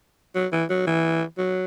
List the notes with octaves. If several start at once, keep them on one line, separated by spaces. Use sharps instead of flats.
F#3
E3
F#3
E3
F#3